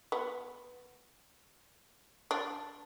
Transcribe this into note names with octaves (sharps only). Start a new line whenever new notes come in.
B3
D4